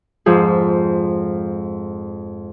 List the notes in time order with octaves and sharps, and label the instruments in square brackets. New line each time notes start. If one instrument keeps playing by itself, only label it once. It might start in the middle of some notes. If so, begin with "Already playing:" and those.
[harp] F2 G#2 F3 G#4